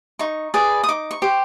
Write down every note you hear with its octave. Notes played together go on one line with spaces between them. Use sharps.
D#4 C#6
G#4 B4 D5
D#6
D#4 D6
C#6
G4 C5